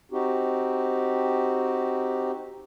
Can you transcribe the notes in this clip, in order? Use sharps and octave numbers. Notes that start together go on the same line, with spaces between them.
C4 D#4 F#4 G4